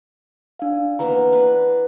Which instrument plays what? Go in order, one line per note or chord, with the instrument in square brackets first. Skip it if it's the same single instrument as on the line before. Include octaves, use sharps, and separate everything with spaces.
[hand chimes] D4 F5
[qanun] E3 A#3 B3 [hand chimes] A#5
[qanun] D4 B4